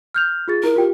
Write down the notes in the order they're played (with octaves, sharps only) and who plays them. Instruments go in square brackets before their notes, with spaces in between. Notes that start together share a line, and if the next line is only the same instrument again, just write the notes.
[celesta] F6 G6 F7
F4 G#4 A6
[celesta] E4 [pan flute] A#4
[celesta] F4 G4 G5